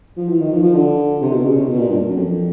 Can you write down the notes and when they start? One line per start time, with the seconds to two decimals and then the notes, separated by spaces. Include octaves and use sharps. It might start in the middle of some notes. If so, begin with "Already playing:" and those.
0.17 F3
0.28 E3
0.40 D#3
0.52 F3
0.63 F3
0.75 D3
1.21 C3
1.33 B2
1.44 C#3
1.56 C3
1.67 B2
1.79 A#2
1.90 G2
2.08 F#2
2.16 F2